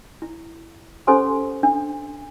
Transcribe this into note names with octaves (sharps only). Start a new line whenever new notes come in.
E4
C#4 G4 A4 C5 G#5 C6
D4